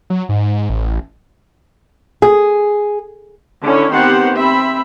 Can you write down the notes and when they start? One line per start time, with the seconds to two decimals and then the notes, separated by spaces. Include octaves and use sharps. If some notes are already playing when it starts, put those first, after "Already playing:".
0.10 F#3
0.29 G#2
0.70 A1
2.22 G#4
3.62 D3 C#4 E4 C#5
3.92 D#3 B3 C4 G4 C5 F#5
4.35 C4 E5 B5